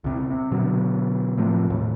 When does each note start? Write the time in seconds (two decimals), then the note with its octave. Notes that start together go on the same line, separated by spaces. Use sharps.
0.04 C#2 C3
0.30 C3
0.52 B2 D3 F#3
1.38 A2 C3 F3
1.70 D#2 A2